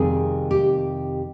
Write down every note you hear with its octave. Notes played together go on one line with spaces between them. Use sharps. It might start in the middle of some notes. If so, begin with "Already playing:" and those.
Already playing: F2 C3 D#3 G3 G#4
G4